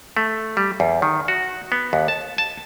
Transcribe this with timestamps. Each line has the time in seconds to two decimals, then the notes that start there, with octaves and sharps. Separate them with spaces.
0.17 A3
0.57 G3
0.80 E2
1.02 D#3
1.28 F#4
1.72 B3
1.93 D#2
2.08 A5
2.38 A5